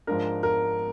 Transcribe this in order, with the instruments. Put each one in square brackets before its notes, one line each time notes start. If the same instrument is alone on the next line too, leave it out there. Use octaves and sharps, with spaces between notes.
[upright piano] G#2 F3 G#3 D4 A#4
A#4